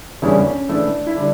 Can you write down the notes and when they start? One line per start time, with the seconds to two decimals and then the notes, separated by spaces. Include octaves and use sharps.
0.22 E2 C#3 G3 C#4 D4 E4
0.45 C#4
0.69 C#3 E3 A3 D4 E4
1.07 E4
1.17 D3 G3 D4